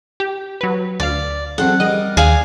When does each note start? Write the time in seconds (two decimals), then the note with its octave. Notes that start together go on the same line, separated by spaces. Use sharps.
0.20 G4
0.61 F#3 B4
1.00 D2 D5 F5
1.58 F#3 C4 A4 F#5
1.80 G3 A#4 D5 D#5
2.17 D#2 G#4 D5 F5 G#5